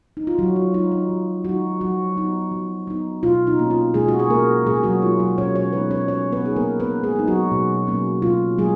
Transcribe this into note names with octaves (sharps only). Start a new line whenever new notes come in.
D#4
F4
F3 F#3 F#4
F4
G#3 D#4 F4
D#4
F3
F#3 G#3 D#4 F#4
F3 F#3 F#4
B3 D#4
F3
B3 D#4
B2 F4
D#4
A#3 C#4
F4
B2 G#3 G#4
F#4
G#4
A#3 C#4 A#4
B2 G#3 G#4
F#3 F#4
G#3 D#4 F4
F#3 F#4
B2 C#4 C#5
C#4 C#5
G#3 B3 D#4 B4
C#4 C#5
F3 C#4 C#5
B3 B4
B3 D#4 G#4
A#3 A#4
F3 B3 B4
G#3 G#4
B3 D#4
F#3 F#4
B2
F#3 A#3 C#4
B2 F4
F#3 G#3 A#3 G#4